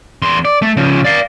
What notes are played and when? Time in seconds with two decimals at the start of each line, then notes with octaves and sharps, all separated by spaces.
0.22 E2 C6
0.45 D5
0.62 A3
0.77 C#3 F3
1.04 D5 F5